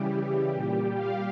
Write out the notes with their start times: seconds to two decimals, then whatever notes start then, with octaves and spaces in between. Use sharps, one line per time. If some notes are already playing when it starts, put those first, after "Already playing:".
Already playing: C#3 E3 G3 G4
0.48 A#2 G3 G4
0.97 F5